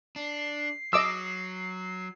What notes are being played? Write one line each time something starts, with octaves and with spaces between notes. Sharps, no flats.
D4 C7
F#3 D#5 D6 E6